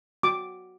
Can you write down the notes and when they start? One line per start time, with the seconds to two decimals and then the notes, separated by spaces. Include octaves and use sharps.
0.23 F#4 D6